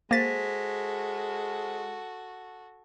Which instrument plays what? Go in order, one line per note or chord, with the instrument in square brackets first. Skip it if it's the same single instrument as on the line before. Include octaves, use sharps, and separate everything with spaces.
[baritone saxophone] G#3 [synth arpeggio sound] A#3 A6 [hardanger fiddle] F#4 A4 [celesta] C5 B6